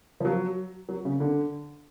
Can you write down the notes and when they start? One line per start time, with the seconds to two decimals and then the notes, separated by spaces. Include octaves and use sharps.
0.20 F3
0.25 F#3
0.89 F#3
1.05 C#3
1.20 D3